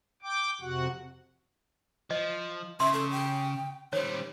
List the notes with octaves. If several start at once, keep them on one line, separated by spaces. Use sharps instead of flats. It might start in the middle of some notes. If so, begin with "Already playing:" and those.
G5 D6
F2 C3 F#4 F#5
F3 D#5
C#3 E5 C6
A4
G5
D#3 G3 C5 C#5